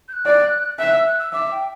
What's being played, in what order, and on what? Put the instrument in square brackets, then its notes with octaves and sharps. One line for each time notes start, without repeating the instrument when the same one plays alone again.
[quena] G6
F#6
[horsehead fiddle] D5
[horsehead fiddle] E5 [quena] F#6
[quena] E6
F#6
E6
[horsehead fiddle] E5 [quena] D6
[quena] G5